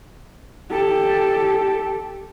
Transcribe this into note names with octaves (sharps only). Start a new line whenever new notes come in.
G4 A4